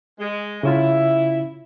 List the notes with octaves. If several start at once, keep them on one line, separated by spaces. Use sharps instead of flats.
G#3
C#3 C#4 E4 F4